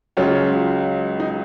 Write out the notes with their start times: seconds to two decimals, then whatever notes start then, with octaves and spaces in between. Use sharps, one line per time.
0.17 C#2 C#3 F#3 C#4 F4
1.20 D#4